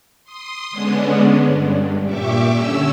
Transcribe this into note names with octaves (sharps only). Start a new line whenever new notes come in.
C6 D#6
D3 G#3 B3 C#4 D4
G2
A#2 G4 E5 C#6 D6
D3 C#4 E6